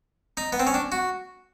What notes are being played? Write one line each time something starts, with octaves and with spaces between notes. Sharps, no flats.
D#4
B3
C4
C#4
D4
F#4